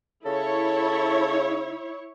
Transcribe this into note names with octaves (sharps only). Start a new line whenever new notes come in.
C#3 E4 A4 C#5